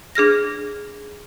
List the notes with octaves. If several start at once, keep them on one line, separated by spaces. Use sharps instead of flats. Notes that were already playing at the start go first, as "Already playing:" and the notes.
D4 G#4 F6 A#6